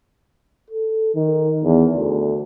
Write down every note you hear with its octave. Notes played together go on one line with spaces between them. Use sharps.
A4
D#3
E2
D2